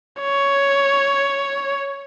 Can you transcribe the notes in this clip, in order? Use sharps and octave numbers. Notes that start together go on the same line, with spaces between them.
C#5